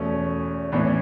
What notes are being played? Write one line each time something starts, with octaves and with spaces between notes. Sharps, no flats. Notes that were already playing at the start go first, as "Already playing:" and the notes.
Already playing: E2 B2 A3 C#4
A2 E3 B3 D4
C#4
D4